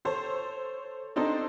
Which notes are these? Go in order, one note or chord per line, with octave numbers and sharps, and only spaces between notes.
A4 C5 C#5
C4 D4 D#4 A4 C5